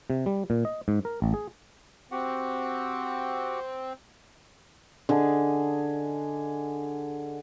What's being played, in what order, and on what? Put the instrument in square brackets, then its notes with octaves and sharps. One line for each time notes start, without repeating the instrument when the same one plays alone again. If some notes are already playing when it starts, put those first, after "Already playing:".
[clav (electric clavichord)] C3
G3
A#2
D#5
G#2
A#4
A1
G#4
[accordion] C4 [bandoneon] F#4 G4 F#5
[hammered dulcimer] D3 G#4 D#5